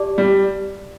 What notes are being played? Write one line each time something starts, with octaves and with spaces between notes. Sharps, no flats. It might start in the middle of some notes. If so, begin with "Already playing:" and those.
Already playing: G4 D5 A5 D6
G3